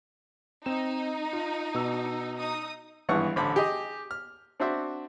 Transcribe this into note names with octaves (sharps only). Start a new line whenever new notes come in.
C4 D#4 E7
F4
B2 E6
D#4 D#6
G#1 G2 E3 B3 F#5 C#6
A1 D3 C5 B5
G4 G#4 D#5
F6
C4 D4 F#4 C5 E5